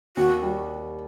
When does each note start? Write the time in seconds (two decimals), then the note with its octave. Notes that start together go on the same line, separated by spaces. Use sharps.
0.17 D#2 F#4
0.42 G3